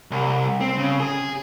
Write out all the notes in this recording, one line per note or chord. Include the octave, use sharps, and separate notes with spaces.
C2
C4
C#3
G#4